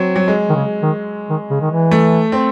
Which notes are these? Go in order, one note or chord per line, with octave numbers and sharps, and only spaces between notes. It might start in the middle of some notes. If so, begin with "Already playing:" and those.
Already playing: F#3 C4
F#3
G#3
D#3
C#3
D#3
D#3
C#3
D#3
E3
A3
C4